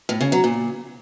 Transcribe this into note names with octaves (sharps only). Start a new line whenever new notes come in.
A2
C#3
F#3
A#2